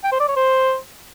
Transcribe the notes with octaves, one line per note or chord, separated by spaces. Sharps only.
G5
C5
D5
C#5
C5